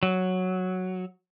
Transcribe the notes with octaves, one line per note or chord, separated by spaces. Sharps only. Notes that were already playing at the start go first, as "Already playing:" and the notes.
F#3